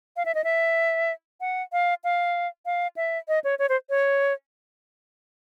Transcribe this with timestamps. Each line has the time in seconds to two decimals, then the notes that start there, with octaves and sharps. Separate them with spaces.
0.17 F5
0.25 E5
0.35 D#5
0.44 E5
1.41 F#5
1.72 F5
2.04 F5
2.66 F5
2.96 E5
3.28 D#5
3.44 C#5
3.59 C#5
3.69 C5
3.90 C#5